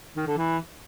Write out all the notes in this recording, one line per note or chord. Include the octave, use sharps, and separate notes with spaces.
D#3
D3
E3